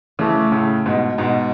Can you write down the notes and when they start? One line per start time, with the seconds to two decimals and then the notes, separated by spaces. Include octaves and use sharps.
0.19 C#3 E3 A3
0.52 A2 C#3
0.86 G#2 B2
1.18 G#2 B2